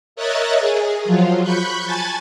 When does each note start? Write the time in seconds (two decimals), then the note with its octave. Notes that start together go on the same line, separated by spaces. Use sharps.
0.16 A#4 C#5 D#5 E5 F#6 A6
0.59 G#4
1.04 F3 F#3 F4
1.42 B5 C#6 F#6 G6
1.85 G#5 A5 G#6 A6